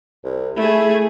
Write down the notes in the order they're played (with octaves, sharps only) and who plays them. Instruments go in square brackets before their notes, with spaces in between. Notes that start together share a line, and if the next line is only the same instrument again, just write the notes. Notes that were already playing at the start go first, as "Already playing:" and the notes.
[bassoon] C2
[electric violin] A3 G#4 [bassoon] E4